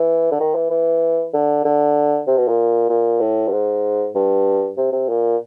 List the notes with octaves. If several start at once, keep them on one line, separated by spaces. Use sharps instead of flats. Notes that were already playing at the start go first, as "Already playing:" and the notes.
Already playing: E3
D3
D#3
E3
E3
D3
D3
C3
B2
A#2
A#2
A2
G2
G#2
G2
C3
C3
A#2